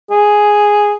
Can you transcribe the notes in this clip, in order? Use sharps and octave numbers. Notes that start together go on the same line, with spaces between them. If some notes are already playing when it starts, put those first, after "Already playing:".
G#4